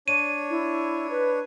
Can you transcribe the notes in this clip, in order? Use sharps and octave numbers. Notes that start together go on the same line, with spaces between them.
D4 C#5 D#7
E4
B4